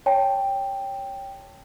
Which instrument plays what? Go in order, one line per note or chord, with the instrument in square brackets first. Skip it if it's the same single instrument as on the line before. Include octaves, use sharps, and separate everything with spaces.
[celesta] C#5 G5 A5